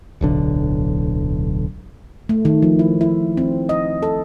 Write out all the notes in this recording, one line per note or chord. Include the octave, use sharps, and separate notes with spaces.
D1 B1 D3
A3
D#3
F3
E4
E4
C4
D#5
A4